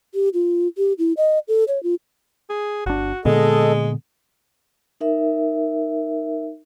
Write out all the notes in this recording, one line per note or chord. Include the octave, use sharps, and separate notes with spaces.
G4
F4
G4
E4
D#5
A4
C#5
F4
G#4
G1 D4 F#4
A#2 D3 G#3 B3 A4 D#5
D#4 A#4 E5